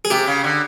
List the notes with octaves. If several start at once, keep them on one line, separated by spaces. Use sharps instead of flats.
G#4
C3 G4
C#3
D3